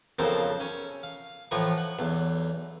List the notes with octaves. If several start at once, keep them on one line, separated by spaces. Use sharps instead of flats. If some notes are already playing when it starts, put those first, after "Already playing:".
B1 F2 C#3 A4 A#4 C5
C#4
F5
A2 E3 F3 A#5 C#6
F#5
B1 E2